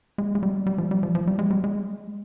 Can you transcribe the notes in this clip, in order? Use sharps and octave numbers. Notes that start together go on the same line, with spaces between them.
G#3
G#3
G3
G3
F3
G3
F3
F3
G3
G#3
G3
G#3